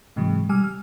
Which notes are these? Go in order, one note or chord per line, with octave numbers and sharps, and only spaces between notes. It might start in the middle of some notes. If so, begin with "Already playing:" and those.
G#2 C3 E3 F#3 G#3
B2 G3 G#5 E6 F6
F6